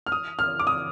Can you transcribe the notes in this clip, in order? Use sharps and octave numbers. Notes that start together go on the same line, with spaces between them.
F6
D#6
F6
D6
D#6